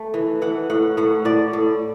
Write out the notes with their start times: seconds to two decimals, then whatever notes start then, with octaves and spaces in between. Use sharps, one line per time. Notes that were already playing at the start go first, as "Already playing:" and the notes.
Already playing: A3
0.14 E3
0.42 E3 F#5
0.70 A2 F#5
0.97 A2 F#5
1.25 A2 D5
1.53 A2